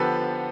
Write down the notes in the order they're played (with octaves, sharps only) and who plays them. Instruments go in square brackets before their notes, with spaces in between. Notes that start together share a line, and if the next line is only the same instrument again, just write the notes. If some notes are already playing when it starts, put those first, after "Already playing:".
Already playing: [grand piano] D3 F3 B3 G4 A4 B4